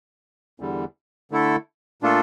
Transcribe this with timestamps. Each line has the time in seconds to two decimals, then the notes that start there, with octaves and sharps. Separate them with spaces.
0.60 E2 D3 G3
1.31 D3 A3 E4 A4
2.02 A#2 A3 D4 F4 A4